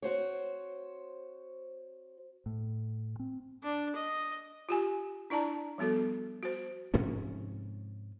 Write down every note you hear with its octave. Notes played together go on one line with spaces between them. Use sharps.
C4 F#4 C5 C#5
A2
C4
D4
D#5
F4 G4 G#5
D4 E4 D5 A5 A#5
F3 G3 B3 F#4 A4
F#4 C5
G#2 C3 F3 C#4